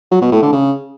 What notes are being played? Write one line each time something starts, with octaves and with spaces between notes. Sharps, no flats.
F#3
B2
A2
D3
C#3